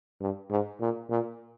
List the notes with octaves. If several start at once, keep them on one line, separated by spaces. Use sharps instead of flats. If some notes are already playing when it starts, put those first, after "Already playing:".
G2
G#2
A#2
A#2